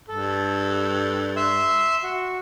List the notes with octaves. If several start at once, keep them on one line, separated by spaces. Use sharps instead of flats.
G2 A4
E5 C6 E6
F#4